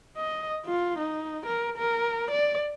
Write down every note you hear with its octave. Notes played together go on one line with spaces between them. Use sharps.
D#5
F4
D#4
A#4
A#4
D5